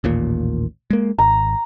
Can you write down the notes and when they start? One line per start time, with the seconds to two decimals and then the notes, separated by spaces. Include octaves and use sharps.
0.04 A1 D#2 A#2
0.90 G#3 A#3
1.18 G#1 A#5